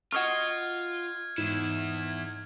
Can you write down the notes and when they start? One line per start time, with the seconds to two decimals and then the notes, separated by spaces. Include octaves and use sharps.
0.12 F4 F#4 D#5 C#6 F6 G#6
1.38 E2 G#2 E4